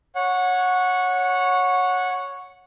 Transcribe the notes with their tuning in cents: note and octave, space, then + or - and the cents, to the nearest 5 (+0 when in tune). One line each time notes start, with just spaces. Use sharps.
C#5 +0 F#5 -20